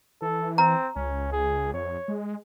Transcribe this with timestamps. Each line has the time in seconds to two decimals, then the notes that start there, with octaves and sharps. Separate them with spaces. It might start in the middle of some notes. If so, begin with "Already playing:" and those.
0.22 E3 A4
0.58 C4 A#5
0.96 C#2 C#4
1.32 G#4
1.73 F2 C#5
2.08 G#3